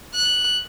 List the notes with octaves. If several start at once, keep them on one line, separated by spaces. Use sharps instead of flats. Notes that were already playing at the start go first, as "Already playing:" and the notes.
F#6